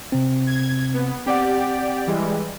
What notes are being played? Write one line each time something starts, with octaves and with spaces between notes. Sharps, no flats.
C3 C4
G#6
B3
C4 G4 D5 F#5
E3 G3 G#3